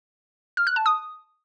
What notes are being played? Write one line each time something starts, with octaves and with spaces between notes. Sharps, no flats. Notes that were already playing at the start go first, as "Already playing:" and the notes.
F6
F#6
A5
D#6